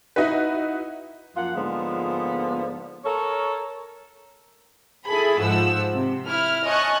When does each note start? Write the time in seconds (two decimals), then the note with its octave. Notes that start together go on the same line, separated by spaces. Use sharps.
0.16 D#4 E4 F#4 B4
1.36 F#2 F3 A#3 F4 F#5
1.55 G#2 D3 F3 G#3 A#3 B3
3.04 A4 A#4 C#5
5.07 E4 G#4 A4 G#5 B5
5.40 G#2 F3 F#5 E6
5.93 C3
6.27 E4 F6
6.65 C#5 D#5 G#5 A5 C#6 F#6